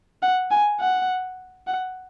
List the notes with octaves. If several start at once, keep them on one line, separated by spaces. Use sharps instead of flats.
F#5
G#5
F#5
F#5